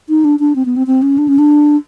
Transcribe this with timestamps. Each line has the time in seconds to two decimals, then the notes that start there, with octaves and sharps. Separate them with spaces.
0.09 D#4
0.25 D4
0.39 D4
0.56 C4
0.65 B3
0.77 C4
0.87 C4
1.02 C#4
1.18 D4
1.28 C#4
1.39 D4